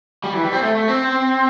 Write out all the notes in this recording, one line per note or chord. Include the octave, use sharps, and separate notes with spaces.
G3
E3
G3
C4
A3
A3
C4